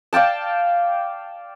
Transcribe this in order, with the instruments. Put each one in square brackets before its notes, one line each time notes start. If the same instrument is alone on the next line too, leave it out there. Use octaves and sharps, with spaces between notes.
[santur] D5 F5 G5 A5